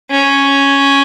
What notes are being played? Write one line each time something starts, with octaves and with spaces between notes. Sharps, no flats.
C#4